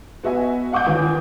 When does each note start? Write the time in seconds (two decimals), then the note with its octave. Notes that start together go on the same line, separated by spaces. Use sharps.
0.24 B3 F#4 D#5 E5 G#5
0.72 F5 F#5 D6 D#6 G6
0.86 G1 D#2 E3 G#5